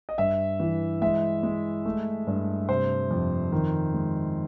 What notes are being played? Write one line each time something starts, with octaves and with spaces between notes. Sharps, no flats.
D#5
G2 E5
E3
G#3 E5
G#3
A3
G2
C3 C5
F2
D#3
G#3